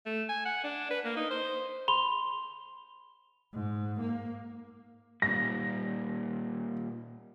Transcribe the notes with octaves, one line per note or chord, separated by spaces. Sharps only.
A3
G#5
F#5
D4
B4
A#3
D#4
C5
B5 C6 F7 G7
G#2
A#3
A#2 G3 A#6